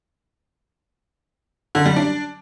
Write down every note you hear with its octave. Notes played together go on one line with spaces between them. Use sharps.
D3
G3
D4